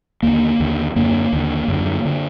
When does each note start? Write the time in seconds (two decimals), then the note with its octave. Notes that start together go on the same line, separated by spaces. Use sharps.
0.23 D#2 D3 A#3
0.60 D#2 D3
0.96 F#2 D3 A#3
1.33 D#2 D3
1.68 F#2 D3
2.05 D3